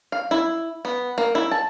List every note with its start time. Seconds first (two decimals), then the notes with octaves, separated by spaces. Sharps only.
0.12 F5
0.31 E4
0.85 B3
1.18 A#3
1.35 E4
1.51 A5